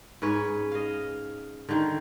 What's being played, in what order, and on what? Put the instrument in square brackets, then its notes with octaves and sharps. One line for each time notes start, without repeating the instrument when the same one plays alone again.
[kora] G#2 C#4 B4 C#5
D#5 F5
D3 D#3